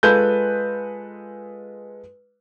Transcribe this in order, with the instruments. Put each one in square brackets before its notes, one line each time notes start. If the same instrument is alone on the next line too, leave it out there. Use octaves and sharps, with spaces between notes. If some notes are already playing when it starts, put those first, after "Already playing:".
[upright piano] G#3 F4 A4 B4 G6